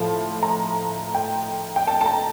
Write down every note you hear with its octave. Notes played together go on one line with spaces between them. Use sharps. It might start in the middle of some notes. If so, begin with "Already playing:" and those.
Already playing: A2 F3 A5
A#5
G5
G5
A5
A5
A#5